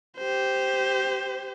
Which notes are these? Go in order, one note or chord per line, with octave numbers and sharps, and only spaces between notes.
G4 C5